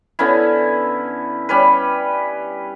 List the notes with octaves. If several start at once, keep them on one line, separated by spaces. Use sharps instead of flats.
D3 B3 C#4 E4
G3 C#4 B4